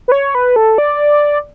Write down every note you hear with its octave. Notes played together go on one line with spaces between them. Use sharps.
B4
C#5
B4
A4
D5